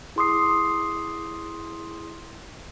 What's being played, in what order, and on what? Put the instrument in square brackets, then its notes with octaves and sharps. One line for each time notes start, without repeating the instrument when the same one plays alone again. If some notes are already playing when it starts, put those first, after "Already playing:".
[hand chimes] E4 G#4 C6 D6 D#6 C7